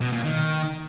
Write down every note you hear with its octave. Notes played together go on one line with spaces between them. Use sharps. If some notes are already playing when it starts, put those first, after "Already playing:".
B2
A#2
D#3